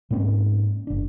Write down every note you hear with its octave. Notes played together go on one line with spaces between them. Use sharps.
G#2 A#3 C4 C#4
F#1 D4